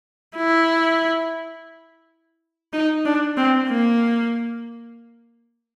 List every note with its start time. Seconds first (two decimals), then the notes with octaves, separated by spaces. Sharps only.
0.37 E4
2.73 D#4
3.05 D4
3.37 C4
3.68 A#3